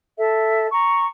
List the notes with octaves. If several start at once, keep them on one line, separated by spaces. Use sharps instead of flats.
A4 E5
A#5 C#6